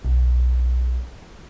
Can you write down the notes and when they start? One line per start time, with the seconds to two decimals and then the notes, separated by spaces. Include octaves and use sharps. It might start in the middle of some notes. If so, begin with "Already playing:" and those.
0.05 B1